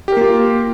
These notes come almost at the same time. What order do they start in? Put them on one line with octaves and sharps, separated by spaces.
G4 A#4 A#3 F4